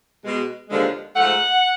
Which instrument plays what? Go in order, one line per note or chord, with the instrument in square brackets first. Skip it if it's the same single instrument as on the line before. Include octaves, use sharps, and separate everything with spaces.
[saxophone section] B2 G#3
D#2 D3 F3 G#3
G#2 F3 A3 F#5